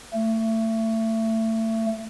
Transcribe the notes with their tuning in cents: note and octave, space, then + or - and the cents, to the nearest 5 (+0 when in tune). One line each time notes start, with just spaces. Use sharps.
A3 +25